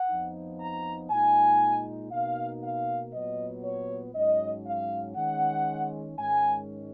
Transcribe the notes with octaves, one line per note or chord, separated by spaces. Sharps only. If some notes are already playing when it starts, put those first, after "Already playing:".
Already playing: F#5
F2 F3 B3 D#4
A#5
A#2 G#3 D#4 G#5
B2 A#3 D#4 F5
F5
A#2 F#3 B3 D#5
C#5
G#2 F#3 C#4 D#5
F5
D#3 G#3 C#4 F#5
G#2 D#3 G#3 C#4 G#5